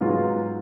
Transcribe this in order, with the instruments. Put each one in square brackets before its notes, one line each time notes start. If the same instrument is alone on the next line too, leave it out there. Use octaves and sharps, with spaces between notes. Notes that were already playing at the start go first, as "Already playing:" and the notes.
[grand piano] G#2 F#3 B3 F4 G#4